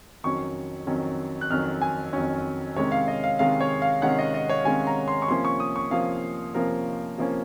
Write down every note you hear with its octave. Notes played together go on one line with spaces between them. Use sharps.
F2 D#3 F#3 C#4 C#6
F2 D#3 F#3 C#4
F#6
F2 D#3 F#3 C#4 F6
G#5
F2 D#3 F#3 C#4
C3 D#3 G#3 C#4 C#5
F5
D#5
F5
C3 D#3 G#3 C#4 F5
C#5
F5
C3 D#3 G#3 C#4 F#5
D#5
D#5
C#5
C3 D#3 G#3 C#4 G#5
A#5
C6
C#6
C3 F3 A#3 C#4 C6
C#6
D#6
C#6
C3 F3 A#3 C#4 F5
C3 F3 A#3 C#4 A#4
C3 F3 A#3 C#4